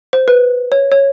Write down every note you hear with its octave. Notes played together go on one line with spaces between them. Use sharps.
C5
B4
C#5
C#5